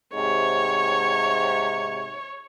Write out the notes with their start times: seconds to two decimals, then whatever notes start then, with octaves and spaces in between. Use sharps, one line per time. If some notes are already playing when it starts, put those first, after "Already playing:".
0.15 G#2 C3 C#5